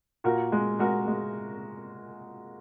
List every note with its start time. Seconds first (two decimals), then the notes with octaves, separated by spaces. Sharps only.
0.24 A#2 F#4 A#4
0.52 G#3
0.79 G#3 F#4 A#4
1.08 G#3